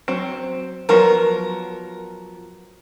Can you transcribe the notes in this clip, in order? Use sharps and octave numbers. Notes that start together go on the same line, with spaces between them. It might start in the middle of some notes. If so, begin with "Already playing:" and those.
F#3 C4
F3 F#3 B3 A#4